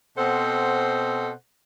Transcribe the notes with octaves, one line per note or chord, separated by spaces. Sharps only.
B2 C4 A4 C5 F#5